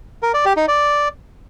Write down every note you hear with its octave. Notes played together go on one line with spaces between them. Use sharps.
A#4
D5
G4
D#4
D5